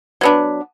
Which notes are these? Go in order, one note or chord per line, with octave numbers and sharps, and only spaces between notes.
F#3 B3 D4